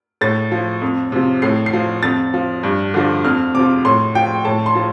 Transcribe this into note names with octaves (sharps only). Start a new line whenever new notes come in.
A2 A6
F3
F2
C3 F3
A2 C7
C7
F3
F2 A6
F3
G2
D3 F3
F2 F6
C3 F3 D6
A2 C6
F3 G5
A2 A5
C6
F3